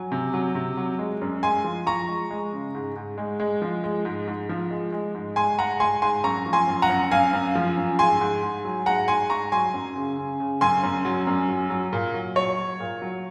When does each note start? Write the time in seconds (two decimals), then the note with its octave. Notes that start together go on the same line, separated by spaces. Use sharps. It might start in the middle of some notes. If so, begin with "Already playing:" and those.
Already playing: F#3 G#5
0.12 C3
0.34 F#3
0.55 C3
0.77 F#3
0.99 G#3
1.21 F#2
1.43 G#3 G#5 C6
1.64 F3
1.86 F3 A#5 C#6
2.08 G#3
2.31 G#3
2.53 C#3
2.75 G#2
2.96 G#2
3.18 G#3
3.40 G#3
3.62 F3
3.84 G#3
4.05 G#2
4.28 G#2
4.49 F3
4.71 G#3
4.92 G#3
5.14 G#2
5.36 G#3 G#5 C6
5.59 G#2 F#5 A#5
5.80 G#3 G#5 C6
6.02 G#2 G#5 C6
6.24 F#2 A#5 C#6
6.46 F3
6.53 G#5 C6
6.68 F#2
6.82 F#5 A#5
6.89 F#2
7.11 F#2 F5 G#5
7.33 F#2
7.55 F3
7.77 F#2
7.99 G#2 G#5 C6
8.21 G#2
8.43 G#2
8.65 F#3
8.86 G#2 F#5 A#5
9.08 G#2 G#5 C6
9.30 G#2 A#5 C#6
9.52 F#3 G#5 C6
9.74 F#2
9.96 C#3
10.18 C#3
10.40 C#3
10.61 F#2 G#5 C6
10.83 F#2
11.05 F#3
11.27 F#2
11.48 F#3
11.70 F#3
11.93 A#2
12.14 F#3
12.36 F#3 C#5
12.58 F#3
12.80 A#2
13.02 F#3